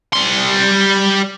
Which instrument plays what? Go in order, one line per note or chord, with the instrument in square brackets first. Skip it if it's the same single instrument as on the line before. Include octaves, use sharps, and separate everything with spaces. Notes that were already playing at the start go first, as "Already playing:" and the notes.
[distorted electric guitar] G3 C6